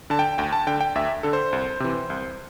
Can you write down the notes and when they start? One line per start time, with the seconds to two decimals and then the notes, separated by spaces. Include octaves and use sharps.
0.10 D3 A5
0.19 G5
0.38 D2 G5
0.52 A5
0.67 D3 G5
0.81 G5
0.95 D2 E5
1.23 D3 A4
1.33 C5
1.53 C2
1.80 C3 E3
2.10 C2